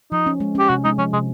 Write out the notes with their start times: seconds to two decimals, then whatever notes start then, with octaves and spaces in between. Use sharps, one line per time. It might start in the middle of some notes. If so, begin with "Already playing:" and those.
0.12 F3 D#4
0.26 C#4
0.40 G#3
0.55 C#4 G4
0.69 C3 F#4
0.85 G#3 D#4
0.98 F3 C#4
1.13 C3 G#3